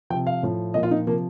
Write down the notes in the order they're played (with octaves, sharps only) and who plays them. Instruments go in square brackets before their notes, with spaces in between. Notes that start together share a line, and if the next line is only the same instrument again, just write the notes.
[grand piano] F3 G5
C3
F5
A2 F3
A#2 F3 D#5
F4
D#4
C3 F3 A#3